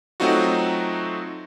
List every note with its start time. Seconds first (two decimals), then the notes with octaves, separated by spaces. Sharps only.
0.20 F#3 A3 C4 D#4 F4 F#4